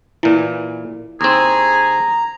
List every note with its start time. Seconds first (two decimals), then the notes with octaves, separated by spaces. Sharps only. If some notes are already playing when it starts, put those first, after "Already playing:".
0.23 A#2 E3 E4
1.21 D#2 C4 G#4 A#5